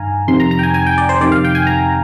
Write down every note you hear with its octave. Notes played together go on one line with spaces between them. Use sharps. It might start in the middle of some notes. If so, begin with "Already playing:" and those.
Already playing: G2 D#3 F5 G#5 A#5
F2 C3 D#3 C6
A#5
A#5
G5
G#5
G#5
G5
D5
C5
F2 C3 D#3 D5
F5
G5
G#5
A#5